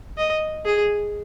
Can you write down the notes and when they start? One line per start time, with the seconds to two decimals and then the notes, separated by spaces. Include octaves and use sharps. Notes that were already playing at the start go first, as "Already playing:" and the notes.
0.18 D#5
0.65 G#4